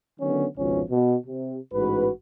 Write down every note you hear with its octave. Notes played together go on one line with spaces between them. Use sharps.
D3 D#3 F#3 B3 C#4
G#1 C#2 B2 F3 C#4
B2
C3
A1 G#2 F#4 B4